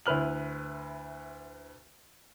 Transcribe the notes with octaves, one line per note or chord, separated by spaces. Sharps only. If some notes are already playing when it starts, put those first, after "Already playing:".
D2 E4 B4 F6 F#7